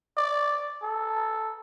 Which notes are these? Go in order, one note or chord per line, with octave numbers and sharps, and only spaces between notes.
D5
A4